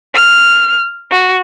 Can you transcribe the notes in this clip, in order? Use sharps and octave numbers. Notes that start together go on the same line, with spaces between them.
F6
F#4